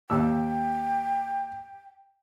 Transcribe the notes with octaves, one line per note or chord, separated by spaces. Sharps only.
D#2 G5 E6